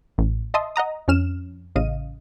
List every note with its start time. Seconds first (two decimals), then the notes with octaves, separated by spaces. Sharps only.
0.18 A1
0.54 D#5 E5 A5 C6 D#6
0.76 D#5 F#5 A#5 D#6
1.08 F2 C#4 F6 E7
1.76 A1 C#3 D#5 F5 D#7